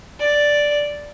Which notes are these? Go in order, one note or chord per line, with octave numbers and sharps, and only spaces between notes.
D5